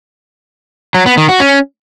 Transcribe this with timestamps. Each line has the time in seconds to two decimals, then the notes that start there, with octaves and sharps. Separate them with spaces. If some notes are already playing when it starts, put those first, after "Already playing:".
0.95 F#3
1.06 B3
1.17 D#3
1.29 F#4
1.40 C#4